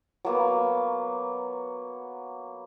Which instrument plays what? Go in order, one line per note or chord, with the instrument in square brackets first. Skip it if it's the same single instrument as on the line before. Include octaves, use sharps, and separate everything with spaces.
[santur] F#3 A#3 B3